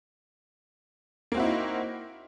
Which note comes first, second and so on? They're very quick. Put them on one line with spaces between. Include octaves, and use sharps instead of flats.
A#3 C4 F#4 E4 D#4